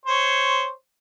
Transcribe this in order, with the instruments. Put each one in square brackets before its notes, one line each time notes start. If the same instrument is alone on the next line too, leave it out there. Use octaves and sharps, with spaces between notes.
[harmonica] C5 C#5